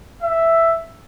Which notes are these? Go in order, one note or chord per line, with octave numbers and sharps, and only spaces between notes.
E5